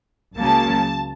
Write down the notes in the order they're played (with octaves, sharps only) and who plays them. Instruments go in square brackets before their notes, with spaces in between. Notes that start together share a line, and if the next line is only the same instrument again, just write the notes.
[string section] C#2 C#3 F#3 A#3 A5